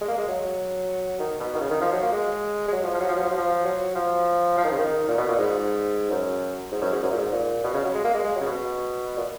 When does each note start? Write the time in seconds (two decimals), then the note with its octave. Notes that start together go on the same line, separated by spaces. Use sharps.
0.01 G#3
0.08 A#3
0.18 G#3
0.28 F#3
1.20 D#3
1.40 B2
1.55 D#3
1.61 C#3
1.71 D#3
1.81 F3
1.92 F#3
2.02 A#3
2.12 G#3
2.68 G#3
2.73 F#3
2.84 F3
2.94 F3
3.01 F#3
3.09 F3
3.17 F#3
3.23 F3
3.30 F#3
3.38 F3
3.65 F#3
3.95 F3
4.57 F3
4.64 D#3
4.72 C#3
4.78 D#3
5.08 A#2
5.18 B2
5.28 A#2
5.38 G#2
6.10 F#2
6.72 G#2
6.82 F#2
6.92 G#2
7.03 F#2
7.11 A#2
7.17 G#2
7.32 A#2
7.64 B2
7.74 C#3
7.85 F#3
7.95 G#3
8.04 A#3
8.14 G#3
8.24 G#3
8.36 F#3
8.41 C#3
8.46 B2
9.17 A#2